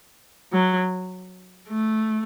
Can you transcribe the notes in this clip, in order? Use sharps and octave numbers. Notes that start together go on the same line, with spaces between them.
F#3
A3